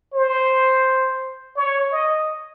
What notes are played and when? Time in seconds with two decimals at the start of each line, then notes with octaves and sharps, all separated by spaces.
0.13 C5
1.56 C#5
1.92 D#5